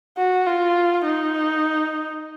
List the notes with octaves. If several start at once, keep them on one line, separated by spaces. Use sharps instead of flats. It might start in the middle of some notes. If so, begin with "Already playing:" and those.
F#4
F4
D#4